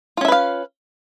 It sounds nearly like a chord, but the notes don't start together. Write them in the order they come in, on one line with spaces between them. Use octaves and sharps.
F4 C#4 E5 B4 F5